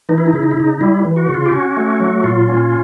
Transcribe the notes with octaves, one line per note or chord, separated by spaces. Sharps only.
E3 D#4
E4
D#4
C#3 E4
D#4
E4
C#3 D#4
G3 E4
E3
F#4
C#3
F4
G4
C#4 F#4
A3
F#3
A#2 F4
C#4